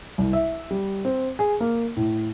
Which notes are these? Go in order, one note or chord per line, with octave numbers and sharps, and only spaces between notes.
C2
E5
G3
C4
G#4
A#3
A2